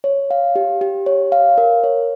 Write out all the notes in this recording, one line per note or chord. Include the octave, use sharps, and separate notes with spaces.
C#5
F5
G4
G4
C#5
F5
A#4
C#5